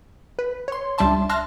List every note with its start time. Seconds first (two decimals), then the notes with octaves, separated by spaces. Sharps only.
0.39 B4
0.68 C#5 C6
0.98 C#2 G3 D4 E5 A5 C6
1.29 E5 A5 C6 F6 F#6 A#6